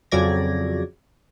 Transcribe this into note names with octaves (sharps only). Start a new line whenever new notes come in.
F2 C#3 F#3 D5 G#6 A#6